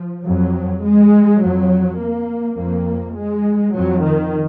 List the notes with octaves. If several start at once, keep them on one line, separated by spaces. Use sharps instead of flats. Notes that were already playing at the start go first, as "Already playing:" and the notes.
Already playing: F3
F2 F#3
G#3
F2 F#3
A#3
F2 A#3
G#3
F2 F#3
D#3